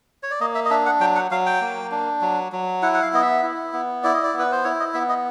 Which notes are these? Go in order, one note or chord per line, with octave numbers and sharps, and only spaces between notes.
C#5
D5
A#3 D#5
E5
D#5
D4 E5
F#5
F#3 G5
F#5
F#3 F5
G5
A#3
D4
F#3
F#3
E4 F#5
F#5
F5
B3 D#5
E5
E4
B3
E4 D5
D#5
D5
B3
B4
C5
E4 C#5
D#5
B3 E5
D#5